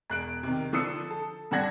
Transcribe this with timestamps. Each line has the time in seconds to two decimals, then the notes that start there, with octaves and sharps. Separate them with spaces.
0.10 E1 F#6 D7
0.43 C3 D#3
0.73 D3 F3 D#6 E6 C#7
1.11 A4
1.51 G2 D3 D4 F#5 G#6 A#6